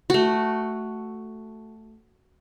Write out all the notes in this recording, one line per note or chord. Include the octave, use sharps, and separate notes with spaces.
A3 F#4